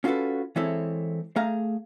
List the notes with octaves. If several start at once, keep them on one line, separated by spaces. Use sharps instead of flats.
C#4 F4 F#4 G#4 A4 B4
E3 G#3 C4 E4 A4 C#5
A3 G#4 F5 A#5